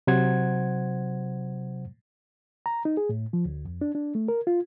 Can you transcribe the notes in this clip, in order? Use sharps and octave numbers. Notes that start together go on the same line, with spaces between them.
C3 F#3 C5 F#5 G#6
A#5
D#4
G#4
A2
F3
D2
F2
D4
D4
A3
A#4
F4